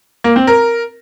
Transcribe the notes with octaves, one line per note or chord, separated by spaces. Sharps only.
A#3
C4
A#4